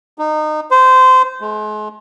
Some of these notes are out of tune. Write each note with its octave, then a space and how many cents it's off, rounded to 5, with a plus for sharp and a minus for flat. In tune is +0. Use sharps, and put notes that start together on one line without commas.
D#4 -25
C5 -20
G#3 +40